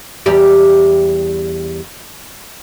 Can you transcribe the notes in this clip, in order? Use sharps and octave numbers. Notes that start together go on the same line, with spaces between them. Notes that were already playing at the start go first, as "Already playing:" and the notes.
E2 G3 G4